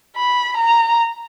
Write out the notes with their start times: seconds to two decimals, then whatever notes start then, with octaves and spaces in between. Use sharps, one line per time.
0.16 B5
0.57 A#5